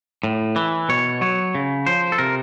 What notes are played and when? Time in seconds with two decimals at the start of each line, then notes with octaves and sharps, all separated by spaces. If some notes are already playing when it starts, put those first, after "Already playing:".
0.24 A2
0.56 E3
0.89 B2 C#5
1.21 F#3 C#5
1.55 C#3
1.86 F3 C5
2.12 A4
2.18 C3 A#4